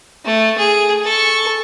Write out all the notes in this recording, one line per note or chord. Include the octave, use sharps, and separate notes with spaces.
A3
G#4
A4 C#6